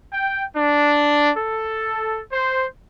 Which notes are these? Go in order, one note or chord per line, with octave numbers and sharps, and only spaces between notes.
G5
D4
A4
C5